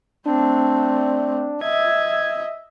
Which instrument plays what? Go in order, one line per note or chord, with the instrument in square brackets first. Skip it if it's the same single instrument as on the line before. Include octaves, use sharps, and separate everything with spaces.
[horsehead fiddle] A3 C4 [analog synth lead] D4
[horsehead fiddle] D#5 E5 [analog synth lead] G#6